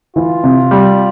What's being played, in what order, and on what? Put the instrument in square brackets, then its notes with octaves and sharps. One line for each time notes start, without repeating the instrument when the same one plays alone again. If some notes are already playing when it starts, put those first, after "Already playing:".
[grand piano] E3 [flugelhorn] F4
[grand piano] C3
G3